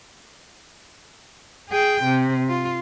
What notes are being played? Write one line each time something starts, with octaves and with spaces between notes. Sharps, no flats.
G#4 G5
C3
F4